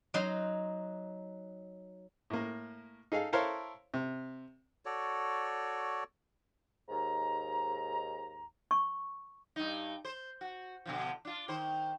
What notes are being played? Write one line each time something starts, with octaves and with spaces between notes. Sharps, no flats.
F#3 D#4 C6
A2 A#3
D#4 G#4 A4 F5
E4 A4 A#4 C5 C#5 F5
C3
F#4 A4 C#5 D5
D#2 G#2 A#5
C#6
G2 D#4
C5
F#4
B2 D3 F3
D4 F4
D#3 C5